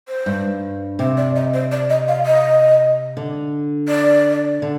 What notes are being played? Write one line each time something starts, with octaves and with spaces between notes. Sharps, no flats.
C5
G2
C3 C5
D5
D#5
C5
D5
D#5
F5
D#5
D3
D5
D3